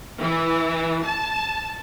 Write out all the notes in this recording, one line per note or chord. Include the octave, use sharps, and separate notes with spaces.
E3
A5